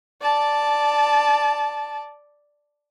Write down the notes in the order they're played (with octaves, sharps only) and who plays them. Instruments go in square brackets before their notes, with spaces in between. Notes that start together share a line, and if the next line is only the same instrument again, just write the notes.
[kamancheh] D5 A5